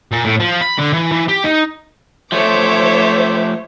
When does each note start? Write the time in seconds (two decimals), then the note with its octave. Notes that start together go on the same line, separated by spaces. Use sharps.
0.11 A#2
0.25 A2
0.40 F3
0.61 B5
0.78 D3
0.93 E3
1.12 E3
1.28 G4
1.44 D#4
2.32 F3 A3 C5 C#5 E5 D6